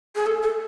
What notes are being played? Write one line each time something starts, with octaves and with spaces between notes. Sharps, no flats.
G#4
A4
A4